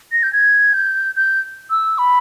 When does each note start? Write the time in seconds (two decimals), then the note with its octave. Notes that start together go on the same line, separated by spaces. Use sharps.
0.12 A#6
0.23 G6
0.33 G#6
0.74 G6
1.16 G6
1.70 E6
1.98 B5